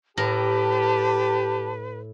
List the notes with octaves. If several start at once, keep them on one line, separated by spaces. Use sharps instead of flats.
A2 G4 A#4 B4 A5